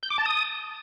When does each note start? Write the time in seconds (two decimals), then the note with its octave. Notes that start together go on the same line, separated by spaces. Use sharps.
0.03 G6
0.10 D6
0.18 A5
0.26 D#6